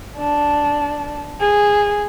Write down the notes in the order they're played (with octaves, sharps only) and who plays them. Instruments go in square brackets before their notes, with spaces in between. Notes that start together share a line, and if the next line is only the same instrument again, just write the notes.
[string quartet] D4
G#4